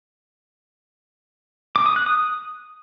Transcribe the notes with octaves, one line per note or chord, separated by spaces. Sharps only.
D6
D#6
F#6
D#6